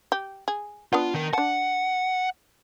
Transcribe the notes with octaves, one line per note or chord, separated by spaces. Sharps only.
G4
G#4
B3 D4 F4 F#5
D#3 A#4
D4 F#5 A5